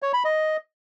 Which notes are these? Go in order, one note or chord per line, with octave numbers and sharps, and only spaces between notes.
C#5
B5
D#5